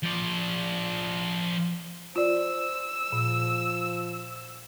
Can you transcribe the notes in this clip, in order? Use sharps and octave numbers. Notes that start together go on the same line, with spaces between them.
F3 D5
F4 C5 D5 E6
A#2 F3